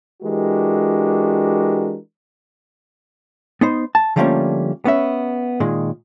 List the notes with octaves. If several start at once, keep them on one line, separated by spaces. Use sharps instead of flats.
E3 G#3 D4 F#4 G4 A#4
B3 D#4 C5
A5
D3 F3 G3 A3 A#3 C#4
B3 C#4 E5
A#2 D#3 G#3